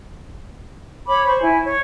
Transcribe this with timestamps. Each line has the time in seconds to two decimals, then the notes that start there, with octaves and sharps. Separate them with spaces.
1.08 C#5 B5 D6
1.24 C5 C#6
1.40 E4 G#5
1.64 C#5